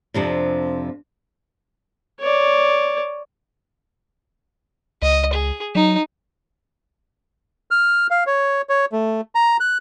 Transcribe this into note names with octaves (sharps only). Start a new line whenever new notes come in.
F2 C3 F3 D4
C#5 D5
C#2 D#5
G#4
F#3 D#4
F6
F5
C#5
C#5
A3
A#5
F#6